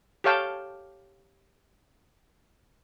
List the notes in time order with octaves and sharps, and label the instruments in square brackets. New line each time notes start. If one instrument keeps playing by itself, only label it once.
[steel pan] G4 A4 C#5 F5 G5 A5